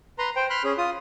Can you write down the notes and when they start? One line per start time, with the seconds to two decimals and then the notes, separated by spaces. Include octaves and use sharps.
0.19 B4 A#5 C6
0.36 C5 G5
0.50 B5 C6 F6 F#6
0.64 C#4 G#4
0.78 F4 D#6